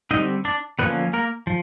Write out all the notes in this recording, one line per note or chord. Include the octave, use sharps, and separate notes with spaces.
D3 G3 C4 D#4 D#5
D4 D5
D3 F3 A#3 B3 C#4 B4
A#3 A#4
F3